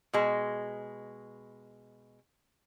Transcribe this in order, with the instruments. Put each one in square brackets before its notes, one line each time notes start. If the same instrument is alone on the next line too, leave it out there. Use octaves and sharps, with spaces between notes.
[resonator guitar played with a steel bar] B2 G#3